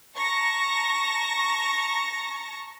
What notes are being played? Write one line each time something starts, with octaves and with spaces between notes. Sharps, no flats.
A5 A#5 C#6 A#6